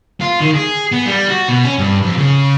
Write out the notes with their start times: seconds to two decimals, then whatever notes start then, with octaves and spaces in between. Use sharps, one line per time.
0.21 F4
0.41 D#3
0.56 G#4
0.92 B3
1.06 G3
1.29 F#4
1.48 B2
1.64 C#4
1.79 G2
2.03 F2
2.17 C#3